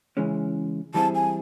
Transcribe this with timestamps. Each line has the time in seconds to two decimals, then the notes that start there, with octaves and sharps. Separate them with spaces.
0.17 C#3 E3 G#3 C#4
0.94 E3 G3 C4 E4 G#4 A5
1.15 G#5